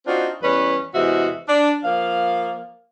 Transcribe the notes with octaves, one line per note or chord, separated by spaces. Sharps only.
C4 D4 D#4 F4 F#4
E2 G3 C#4 B4
E2 C3 G#3 F#4 E5
D4
F3 A#3 F5